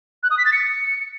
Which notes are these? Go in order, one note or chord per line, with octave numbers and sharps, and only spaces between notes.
F#6
D#6
B6
A6
C#7